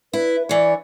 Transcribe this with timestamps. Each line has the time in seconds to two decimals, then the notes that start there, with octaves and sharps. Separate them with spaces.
0.13 E4 B4
0.49 E3 C#5 D5